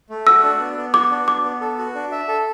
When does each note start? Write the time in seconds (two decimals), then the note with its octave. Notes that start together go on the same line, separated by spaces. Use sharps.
0.10 A3
0.27 F#4 E6
0.43 D4
0.60 B3
0.77 B3
0.94 F#4 D6
1.11 D4
1.27 B3 D6
1.44 B3
1.61 A4
1.78 F#4
1.95 D4
2.12 E5
2.28 A4